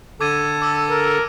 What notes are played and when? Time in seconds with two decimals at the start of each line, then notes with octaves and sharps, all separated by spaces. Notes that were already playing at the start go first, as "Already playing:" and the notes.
0.21 D3 A4 A5 D6 G#6 D#7
0.62 D6 E6 A6
0.90 A#4